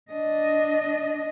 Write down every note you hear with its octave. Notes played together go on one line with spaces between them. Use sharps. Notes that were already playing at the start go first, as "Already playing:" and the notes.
D4 D#5